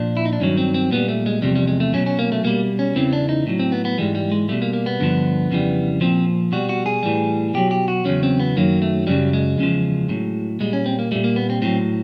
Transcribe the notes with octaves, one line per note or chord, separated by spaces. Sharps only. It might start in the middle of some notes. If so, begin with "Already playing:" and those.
Already playing: A#2 F3 D4
E4
D#4
D4
G2 D#3 F#3 C#4
C4
C4
A#2 G3 B3
A3
G#3
E2 C3 F3 G3
G3
G#3
A3
B2 F#3 C#4
C#4
A#3
A3
B2 G3 A#3
C#4
E2 C#3 E3 C4
D4
D#4
A2 F#3
C4
B3
B3
G#2 E3 G3 G#3
G3
G#3
B2 G3 A3
A#3
A#3
B3
G2 D3 F3
F2 C#3 E3 G3
A#2 F3 C4
B2 G3 F#4
F#4
G#4
A2 E3 G3
B2 F#3 G4
G4
F#4
E2 C#3 F#3 C#4
C4
B3
F#2 D#3 F#3 A#3
A3
F#2 C#3 F#3 G3
G#3
E2 C#3 F3
A2 F#3
A#2 G3 G#3
C#4
C4
A#3
A#2 G3 A3
A#3
B3
C4
A2 F#3 C4